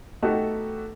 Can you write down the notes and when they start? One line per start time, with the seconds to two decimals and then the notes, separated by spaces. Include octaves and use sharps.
0.22 A3 B3 D#4 F#4 G4 A4